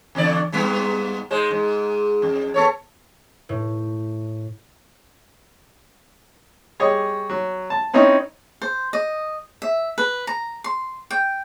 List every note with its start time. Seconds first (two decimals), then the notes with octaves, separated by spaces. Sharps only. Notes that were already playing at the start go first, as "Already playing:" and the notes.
0.15 E2 D3 D5
0.52 G#2 G3 B3
1.31 G#2 G#3 C5
1.51 G#2
2.22 F2
2.54 B3 A4 C#5
3.49 A2
6.80 G3 G#4 C#5 D#5 C#6
7.30 F#3
7.70 A5
7.94 C4 C#4 D#4 E4 C#5 D#5
8.62 C5
8.93 D#5
9.62 E5
9.98 B4
10.27 A#5
10.64 C6
11.11 G5